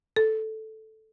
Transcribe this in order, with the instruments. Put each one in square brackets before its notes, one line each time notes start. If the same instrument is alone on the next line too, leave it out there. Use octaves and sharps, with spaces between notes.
[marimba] A4